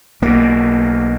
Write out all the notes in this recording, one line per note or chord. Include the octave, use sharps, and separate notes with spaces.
B1 B2 A#3